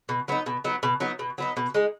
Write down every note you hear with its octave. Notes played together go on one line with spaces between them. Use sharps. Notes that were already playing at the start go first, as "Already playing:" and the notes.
B2
F#3 B3 D#4
B2
F#3 B3 D#4
B2
F#3 B3 D#4
B2
F#3 B3 D#4
B2
G#3 D#4